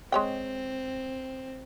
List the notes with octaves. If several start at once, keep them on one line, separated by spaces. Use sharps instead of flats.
G#3 C4 C#5 G5